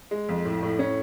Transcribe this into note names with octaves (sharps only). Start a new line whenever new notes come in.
G#3
F2
A2
A2
C#4